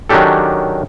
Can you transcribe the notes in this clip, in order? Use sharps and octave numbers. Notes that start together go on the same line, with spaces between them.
D#3 F#3 C#4 D4 G4 A4